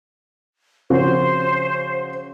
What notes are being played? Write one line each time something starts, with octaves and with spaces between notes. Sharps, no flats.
C#3 F3 F#4 C5